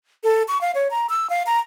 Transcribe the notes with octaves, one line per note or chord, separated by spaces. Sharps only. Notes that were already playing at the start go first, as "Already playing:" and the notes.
A4
C#6
F5
C#5
A#5
E6
F5
A#5